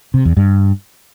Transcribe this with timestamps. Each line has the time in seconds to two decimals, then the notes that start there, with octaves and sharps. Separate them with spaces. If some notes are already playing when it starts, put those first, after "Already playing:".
0.14 C3
0.25 E2
0.37 G2